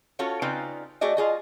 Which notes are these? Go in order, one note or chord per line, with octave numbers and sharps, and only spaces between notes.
C#4 F4 F#4 A4 C#5
C#3 C4 D#4 F4 B4 D5
A3 F#4 G#4 D5 D#5
F4 G#4 D#5